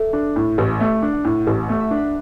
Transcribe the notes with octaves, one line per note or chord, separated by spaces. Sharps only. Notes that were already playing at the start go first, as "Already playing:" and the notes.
Already playing: A4 D5 E5
D4
A2
A1
A3 B4
D4
F#5
A2
A1 A5
F#5
A3
E5
D4
B4